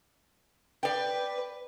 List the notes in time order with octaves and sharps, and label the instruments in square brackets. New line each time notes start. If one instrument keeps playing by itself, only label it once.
[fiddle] B4 [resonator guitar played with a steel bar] D5 G5